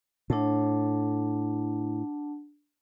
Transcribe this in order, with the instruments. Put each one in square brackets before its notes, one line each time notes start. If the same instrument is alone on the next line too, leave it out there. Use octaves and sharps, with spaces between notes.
[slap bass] A2 [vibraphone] D4 F#5 A5